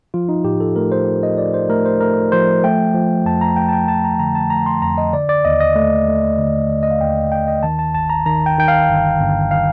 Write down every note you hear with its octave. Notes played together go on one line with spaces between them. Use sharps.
F3 F4
D#4
A2 G4
A4
A3 A#4
C5
F3
D#5
F3 D5
C5
A3 A#4
C5
A3 A#4
F3 C5
A3 G5
F3
F2 A5
A#5
A3 G5
A5
G5
F3 A5
A#5
D3 A#5
A5
A3 A#5
C6
F2 A#5
D#5
D3 D5
D5
D#2 D#5
D#5
A3
A3
D3
D3
D#5
F5
D#2 G5
D#2 G5
D#5
D#3 A5
A5
G1 A5
A#5
D#3 A#5
G5
D#3 G5
F5
G1
G1
D#3 F5